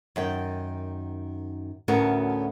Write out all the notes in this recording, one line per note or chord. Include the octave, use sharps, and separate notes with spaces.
F#2 D#3 G5
D2 A2 B3 C#4 F#4 A#4